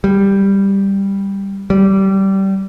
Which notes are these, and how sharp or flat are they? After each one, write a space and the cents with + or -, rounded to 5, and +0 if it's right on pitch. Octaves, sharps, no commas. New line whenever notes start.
G3 +5
G3 -20